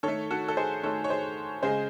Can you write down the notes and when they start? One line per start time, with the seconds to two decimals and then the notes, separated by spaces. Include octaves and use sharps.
0.03 D#3 A3 A4 C#5
0.31 F#4 A4
0.48 A4
0.57 G#4 C5
0.83 D#3 A3 A4 C#5
1.04 C#5
1.10 G#4 C5
1.63 C#3 G#3 G#4 C5